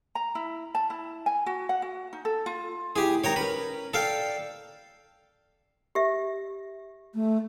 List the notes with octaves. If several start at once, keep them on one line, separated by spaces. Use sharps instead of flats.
A#5
E4
A5
E4
G#5
F#4
F#5
F#4
D#4
A4
F4
D2 E4 G4 G#4
D#3 B3 D#4 C#5 G5 A#5
C#4 A#4 B4
A4 D5 F5 G5
G4 E5
A3